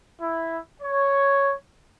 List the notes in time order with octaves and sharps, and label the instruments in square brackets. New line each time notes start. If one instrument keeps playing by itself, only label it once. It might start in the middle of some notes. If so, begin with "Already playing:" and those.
[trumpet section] E4
C#5